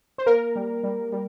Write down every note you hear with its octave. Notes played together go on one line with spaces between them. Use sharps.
C5
A#3 A#4
G3
G3
G3